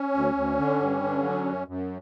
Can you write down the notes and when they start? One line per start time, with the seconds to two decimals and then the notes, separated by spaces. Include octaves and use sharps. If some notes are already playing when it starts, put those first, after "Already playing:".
Already playing: C#4
0.14 D2
0.35 D2
0.57 D3
0.79 G2
1.02 D3
1.23 F#3
1.46 F#2
1.68 F#2